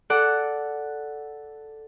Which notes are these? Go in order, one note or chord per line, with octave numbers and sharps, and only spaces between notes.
A4 D5 F#5